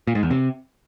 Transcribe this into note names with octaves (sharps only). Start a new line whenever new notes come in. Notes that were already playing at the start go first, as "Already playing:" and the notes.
A#2
G#2
E2
C3